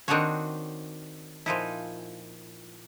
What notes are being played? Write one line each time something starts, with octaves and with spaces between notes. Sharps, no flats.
D#3 C4 D4 D#4 F#4 C#5
A#2 F3 D#4 E4